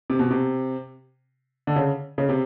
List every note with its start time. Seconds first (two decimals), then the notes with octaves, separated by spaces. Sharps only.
0.10 C3
0.19 B2
0.31 C3
1.67 D3
1.76 C#3
2.18 C#3
2.29 C3